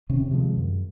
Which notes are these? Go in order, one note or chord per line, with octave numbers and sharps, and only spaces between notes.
E1 C3 D#3 C#4
C3 D#3 F3 G#3
F#2